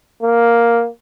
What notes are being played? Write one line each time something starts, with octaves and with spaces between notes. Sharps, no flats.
A#3